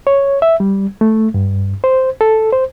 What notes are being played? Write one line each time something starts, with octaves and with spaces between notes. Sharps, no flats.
C#5
E5
G3
A3
G2
C5
A4
C5